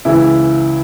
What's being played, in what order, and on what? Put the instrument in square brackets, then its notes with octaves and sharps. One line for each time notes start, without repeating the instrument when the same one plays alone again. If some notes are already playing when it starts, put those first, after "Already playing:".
[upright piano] C#2 C#3 E3 E4